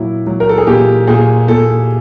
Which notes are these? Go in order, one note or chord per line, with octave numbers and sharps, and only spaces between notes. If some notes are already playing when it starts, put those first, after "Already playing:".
Already playing: A#2 F#3 E4
F#3
A#4
A4
G#4
A#2 G4
A#2 G#4
A#2 A4